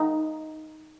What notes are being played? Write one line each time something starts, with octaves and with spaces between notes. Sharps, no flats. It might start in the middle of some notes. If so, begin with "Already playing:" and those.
Already playing: D#4